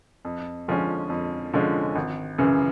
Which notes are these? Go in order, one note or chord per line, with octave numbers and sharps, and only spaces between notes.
F2
D3 F3 G#3 C#4
F2
D3 F3 G#3 C#4
G#1
F#2 C#3 E3